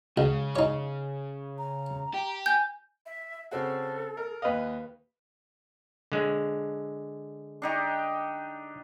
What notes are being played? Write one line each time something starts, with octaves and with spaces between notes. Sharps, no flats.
C#2 C#3
D#4 C#5
A#5
G4
G#5 G6
E5
C#3 C4 F#4 A4
A#4
D#2 B4 D#5 F5
D3 G#3
D4 D#4 G4